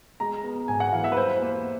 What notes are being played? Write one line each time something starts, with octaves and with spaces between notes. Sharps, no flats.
G#3 A#5
B3
G#2 G#5
F#5
E3 F5
E5
B4
G3 C5
A#3